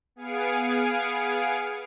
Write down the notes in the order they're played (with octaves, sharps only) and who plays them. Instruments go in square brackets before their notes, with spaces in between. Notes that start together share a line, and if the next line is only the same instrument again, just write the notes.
[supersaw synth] B3 G#4 F5 G#5 C#7 D7